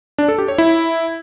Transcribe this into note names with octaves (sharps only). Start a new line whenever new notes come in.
D4
A4
G4
C#5
E4